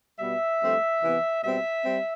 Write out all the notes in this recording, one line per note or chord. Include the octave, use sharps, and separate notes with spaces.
B2 G3 B3 E5
G2 F3 A3 C4
C3 E3 B3
B2 G3 C4 E5
G3 C4